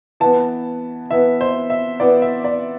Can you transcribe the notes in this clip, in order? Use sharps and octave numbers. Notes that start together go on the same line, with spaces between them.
E3 B3 A5
E3 B3 E5
C5
E5
E3 B3 D5
E5
D5